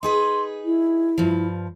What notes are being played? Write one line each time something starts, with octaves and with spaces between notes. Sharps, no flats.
D#4 G#4 B4 C6
E4
G2 F3